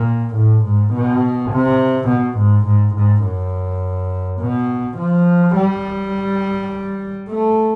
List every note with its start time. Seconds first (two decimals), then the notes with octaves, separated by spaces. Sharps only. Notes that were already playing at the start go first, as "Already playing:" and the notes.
Already playing: A#2
0.36 A2
0.65 G#2
0.94 B2
1.52 C3
2.09 B2
2.38 G#2
2.67 G#2
2.95 G#2
3.25 F#2
4.41 B2
4.98 F3
5.56 G3
7.30 A3